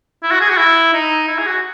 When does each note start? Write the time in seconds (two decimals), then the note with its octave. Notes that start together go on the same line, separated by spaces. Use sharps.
0.23 E4
0.31 F#4
0.41 G#4
0.50 F#4
0.57 E4
0.94 D#4
1.28 E4
1.38 G#4
1.46 F#4